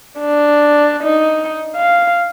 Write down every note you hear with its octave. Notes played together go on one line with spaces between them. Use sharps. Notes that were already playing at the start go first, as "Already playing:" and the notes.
D4
D#4
F5